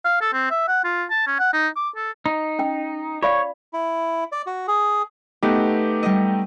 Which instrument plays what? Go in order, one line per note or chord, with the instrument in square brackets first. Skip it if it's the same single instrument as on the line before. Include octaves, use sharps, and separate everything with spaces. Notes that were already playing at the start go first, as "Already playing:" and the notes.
[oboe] F5
A4
C4
E5
F#5
F4
A5
C#4
F#5
D#4
D6
A4
[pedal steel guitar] D#4
[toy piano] C#4 G5
[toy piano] F4 D5 F5 [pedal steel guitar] C#5
[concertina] E4
D5
F#4
G#4
[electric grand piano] A3 D#4 G4 [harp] B3 D#5
[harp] G3 D#5